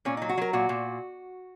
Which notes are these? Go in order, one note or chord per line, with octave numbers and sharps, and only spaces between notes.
A#2 C#4
F#3 D#4
F#4
F#3 A#4
A#2 F#4
A#2